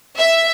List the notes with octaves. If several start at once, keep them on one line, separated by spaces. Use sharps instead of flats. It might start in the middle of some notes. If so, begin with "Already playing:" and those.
E5